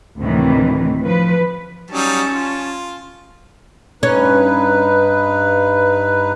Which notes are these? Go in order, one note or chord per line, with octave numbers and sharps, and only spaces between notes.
D2 A2 C3 D#3 E3
F3 B4
F#3 G3 C#4 D#4 A5
F4
G2 C#4 D#4 B4